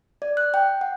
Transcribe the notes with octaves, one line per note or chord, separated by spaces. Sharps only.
D5
F#6
G5
F#5